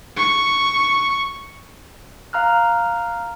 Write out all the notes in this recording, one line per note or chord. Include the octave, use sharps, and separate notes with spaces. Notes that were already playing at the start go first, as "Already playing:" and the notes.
C#6
F5 A#5 F6 F#6